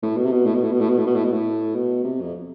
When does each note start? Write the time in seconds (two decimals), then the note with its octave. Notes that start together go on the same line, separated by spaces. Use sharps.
0.03 A2
0.17 B2
0.25 C3
0.32 B2
0.46 A2
0.54 B2
0.63 A2
0.72 B2
0.81 A2
0.89 B2
0.98 A2
1.07 B2
1.15 A2
1.24 B2
1.33 A2
1.75 B2
2.04 C3
2.22 F2